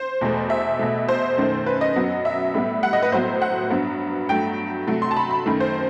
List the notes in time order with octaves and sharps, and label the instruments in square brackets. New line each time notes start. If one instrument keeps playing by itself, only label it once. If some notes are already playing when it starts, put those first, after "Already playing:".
Already playing: [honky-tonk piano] C5
E2 B2 A3
E5
B2 A3
C5
F#2 D#3 A3
B4
D#5
F#2 F#3 B3
E5
A2 G3 B3
F#5
D#5
B4
A2 F#3 B3 C5
F#5
G2 F#3 B3
G2 F#3 A3 G5
C3 F#3 A3
C6
A5
B5
B5
F#2 D#3 A3
C5